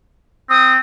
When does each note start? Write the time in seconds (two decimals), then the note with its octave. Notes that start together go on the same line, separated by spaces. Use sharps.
0.50 C4 D#6